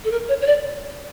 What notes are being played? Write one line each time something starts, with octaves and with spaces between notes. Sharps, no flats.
A4
A#4
C#5
C#5
D5